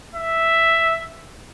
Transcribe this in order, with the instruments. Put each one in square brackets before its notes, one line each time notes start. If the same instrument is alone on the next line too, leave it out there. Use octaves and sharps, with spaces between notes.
[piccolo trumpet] E5